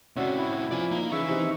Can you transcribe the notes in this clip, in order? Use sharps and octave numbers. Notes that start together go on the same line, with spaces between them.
A2 C3 C#4 F#4 D5 E5
E4
F3 D5 G#5
A#3 D#4 A#5
C#3 E3 E5 C#6
C3 D#4